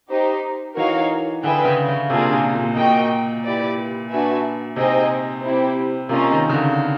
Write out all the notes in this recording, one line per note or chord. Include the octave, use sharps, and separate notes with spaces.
D#4 G4 C5
E3 D#4 F#4 A#4 C#5 F5
D3 G#4 B4 E5 G5
C#3
C#3
C3 A#3 D4 F4 G#4
A#2
A#2
A#2 F#4 A#4 D#5 G5
E4 G4 B4 D5
D4 F#4 B4 E5 G#5
C3 D#4 G#4 C5 D#5 G5
C4 E4 G4
C3 A#3 C#4 F4 A#4 D#5
D#3
C#3
D3